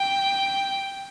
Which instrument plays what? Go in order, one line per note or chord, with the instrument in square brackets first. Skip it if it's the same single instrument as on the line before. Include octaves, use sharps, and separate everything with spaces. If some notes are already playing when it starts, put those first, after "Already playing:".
Already playing: [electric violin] G5